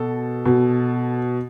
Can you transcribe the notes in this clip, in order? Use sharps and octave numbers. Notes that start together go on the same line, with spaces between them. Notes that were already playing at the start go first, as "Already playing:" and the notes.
Already playing: B2 A4
B2